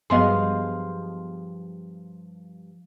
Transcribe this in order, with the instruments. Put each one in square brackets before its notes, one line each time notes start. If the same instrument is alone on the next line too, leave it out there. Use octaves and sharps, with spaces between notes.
[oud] G2 F3 D#5 [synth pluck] F#3 B3 G#4 [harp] F5 C6